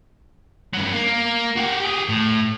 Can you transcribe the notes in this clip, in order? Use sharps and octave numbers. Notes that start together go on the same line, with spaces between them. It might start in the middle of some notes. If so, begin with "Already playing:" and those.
G2 F#3
A#3
F#4 G4
G4 G#4
A2